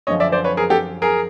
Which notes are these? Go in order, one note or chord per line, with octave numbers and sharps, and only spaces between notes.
F#2 D3 F3 C#5 D#5
D5 E5
C5 D5
B4 C#5
G#4 A#4
G4 A4
G#4 A#4